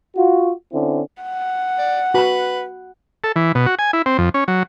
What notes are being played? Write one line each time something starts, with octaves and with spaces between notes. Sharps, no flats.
F4 F#4
D3 C4 C#4 E4
F#5
D5
F#4 B4 B5
A4
E3
B2
F#4
G#5
E4
C4
F2
C#4
F#3